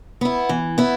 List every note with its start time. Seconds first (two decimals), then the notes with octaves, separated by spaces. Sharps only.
0.21 B3 E4
0.49 E3
0.78 B3 E4